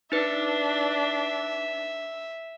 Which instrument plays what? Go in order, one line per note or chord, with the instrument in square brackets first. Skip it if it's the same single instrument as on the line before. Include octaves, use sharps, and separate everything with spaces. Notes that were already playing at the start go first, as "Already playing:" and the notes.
[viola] D4 [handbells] D#4 B4 [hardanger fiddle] E5